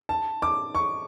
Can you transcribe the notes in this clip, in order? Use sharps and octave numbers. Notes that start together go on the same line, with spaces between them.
A5
D6
C#6